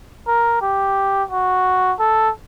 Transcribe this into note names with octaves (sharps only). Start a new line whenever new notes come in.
A#4
G4
F#4
A4